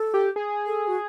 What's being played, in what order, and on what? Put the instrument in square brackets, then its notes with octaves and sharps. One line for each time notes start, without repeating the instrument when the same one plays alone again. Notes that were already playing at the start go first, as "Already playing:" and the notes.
Already playing: [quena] A4
[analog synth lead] G4
G#4
[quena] A4
F#4